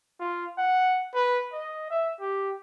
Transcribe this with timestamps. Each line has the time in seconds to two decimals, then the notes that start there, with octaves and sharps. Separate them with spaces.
0.20 F4
0.58 F#5
1.14 B4
1.53 D#5
1.90 E5
2.20 G4